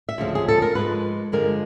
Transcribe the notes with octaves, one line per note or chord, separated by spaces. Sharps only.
E5
D2 C#3 F3 G#3
G#4
A4
A#4
G#2 F3 G#3 B4
G2 D3 F3 G#3 A#4